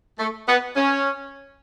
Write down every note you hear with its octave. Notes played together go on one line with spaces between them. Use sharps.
A3
B3
C#4